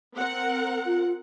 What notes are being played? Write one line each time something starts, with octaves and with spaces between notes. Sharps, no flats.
C4 A#4 F#5
F4